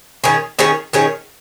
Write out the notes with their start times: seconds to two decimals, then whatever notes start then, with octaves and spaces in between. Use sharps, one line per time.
0.24 D#3 C#4 G#4 C#5
0.59 D#3 C#4 G#4 C#5
0.93 D#3 C#4 G#4 C#5